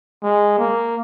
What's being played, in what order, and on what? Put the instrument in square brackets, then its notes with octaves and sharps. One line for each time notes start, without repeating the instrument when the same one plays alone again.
[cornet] G#3
A#3